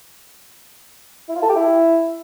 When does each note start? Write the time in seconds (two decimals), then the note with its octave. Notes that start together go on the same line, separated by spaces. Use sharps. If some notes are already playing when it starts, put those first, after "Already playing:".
1.29 E4
1.36 F4
1.43 A4
1.49 G4
1.56 E4